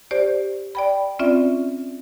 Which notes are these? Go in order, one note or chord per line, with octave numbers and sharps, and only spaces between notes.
G4 C5 D5
D5 G5 B5
C4 C#4 F4 D5 E5